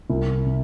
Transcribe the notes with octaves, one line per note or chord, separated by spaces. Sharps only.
C2
C3